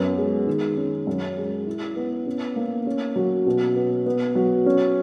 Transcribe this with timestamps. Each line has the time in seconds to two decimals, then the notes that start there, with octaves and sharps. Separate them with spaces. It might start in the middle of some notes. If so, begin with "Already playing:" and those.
Already playing: F#2 B3
0.17 G#3
0.46 D#3
0.77 C#4
1.07 F#2
1.37 G#3
1.67 E4
1.96 B3
2.26 C#4
2.56 A#3
2.87 C#4
3.16 F#3
3.46 B2
3.76 B3
4.06 B3
4.35 F#3
4.66 C#4